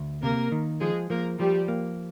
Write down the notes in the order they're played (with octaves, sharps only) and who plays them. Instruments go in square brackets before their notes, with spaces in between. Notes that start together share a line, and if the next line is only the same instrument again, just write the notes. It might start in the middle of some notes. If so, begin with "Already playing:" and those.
Already playing: [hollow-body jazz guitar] D2
[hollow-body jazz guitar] C3 [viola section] A#3 A#4
[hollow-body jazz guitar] D#3
[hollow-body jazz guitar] F3 [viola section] G#3 G#4
[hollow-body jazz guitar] F3 [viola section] A#3 A#4
[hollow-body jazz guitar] F3 [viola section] G3 G4
[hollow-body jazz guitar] A#3